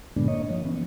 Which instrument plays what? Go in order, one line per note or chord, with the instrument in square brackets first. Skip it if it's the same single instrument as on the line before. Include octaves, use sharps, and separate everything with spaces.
[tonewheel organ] G2 A#2 D3 G#3 B3 D4
A#3 C#5 D#5
F3
E3 B3 C#4